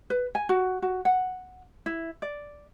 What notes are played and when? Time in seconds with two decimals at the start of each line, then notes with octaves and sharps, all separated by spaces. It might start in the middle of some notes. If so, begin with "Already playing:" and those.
0.10 B4
0.35 G#5
0.49 F#4
0.82 F#4
1.05 F#5
1.86 E4
2.22 D5